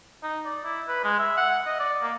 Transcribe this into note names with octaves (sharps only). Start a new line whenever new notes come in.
D#4
D5
E4
B4
G#3
E5
F#5
D#5
D5
A#3